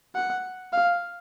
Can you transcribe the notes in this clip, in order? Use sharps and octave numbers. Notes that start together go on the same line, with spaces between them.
F#5
F5